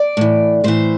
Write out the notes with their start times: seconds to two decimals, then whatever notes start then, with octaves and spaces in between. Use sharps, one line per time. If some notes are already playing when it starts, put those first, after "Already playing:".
Already playing: D5
0.17 A2 E3
0.64 A2 E3 C5